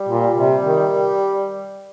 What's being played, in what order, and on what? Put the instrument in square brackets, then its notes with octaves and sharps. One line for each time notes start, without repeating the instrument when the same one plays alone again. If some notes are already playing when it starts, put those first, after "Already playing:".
Already playing: [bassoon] G3
[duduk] A#2
C3
D#3